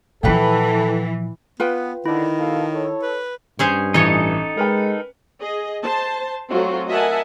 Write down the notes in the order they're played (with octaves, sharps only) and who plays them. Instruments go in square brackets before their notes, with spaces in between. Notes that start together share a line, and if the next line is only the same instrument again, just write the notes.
[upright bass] A#2 F3 [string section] E3 [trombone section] A4 [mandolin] B4 F#5 G5
[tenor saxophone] B3 [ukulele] F4 B4 G5
[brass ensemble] D3 [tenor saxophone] D#3 [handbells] E4
[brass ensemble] B2 A4 F5
A4 C#5
[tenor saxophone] B4
[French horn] G2 [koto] C#4 G#4 C5
[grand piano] A1 E3 C#7 [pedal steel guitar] D#4 A4 [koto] C#5 D#5
[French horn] G#3 [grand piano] A#4 B4 G5
[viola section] G#4 D#5
C5 A5
F#3 A3 C4 F4 F#4
A#4 D#5 E5 F#5 G#5 A5